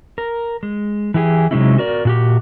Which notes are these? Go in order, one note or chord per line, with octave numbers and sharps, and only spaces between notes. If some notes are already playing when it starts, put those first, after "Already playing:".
A#4
G#3
E3 E4 G4 G#4
C3 F#3 G#3 C#4 D#4 E4
F#4 A#4 D5
A#2 F#4 G4